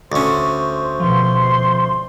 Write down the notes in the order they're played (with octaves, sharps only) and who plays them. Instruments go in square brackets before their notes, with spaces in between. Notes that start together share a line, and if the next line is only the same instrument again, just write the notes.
[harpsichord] D2 C#4 [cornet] C5
[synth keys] B2 F3 [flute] C6